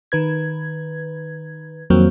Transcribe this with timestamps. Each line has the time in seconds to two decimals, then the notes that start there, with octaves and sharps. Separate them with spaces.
0.12 D#3 B4 G#6
1.90 F2 D#3 F#3 A#3 C4